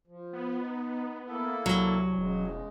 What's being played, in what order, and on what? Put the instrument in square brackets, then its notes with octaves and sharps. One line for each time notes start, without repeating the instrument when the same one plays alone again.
[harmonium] F3
[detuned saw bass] B3
[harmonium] D#4
A#3 E4 A4
[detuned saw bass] C2 [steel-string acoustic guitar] F#3
[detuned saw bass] E1 [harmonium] C#3 G#3